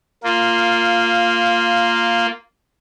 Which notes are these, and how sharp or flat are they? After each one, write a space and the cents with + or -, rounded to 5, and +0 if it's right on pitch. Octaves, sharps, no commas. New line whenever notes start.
A#3 -10 F4 +0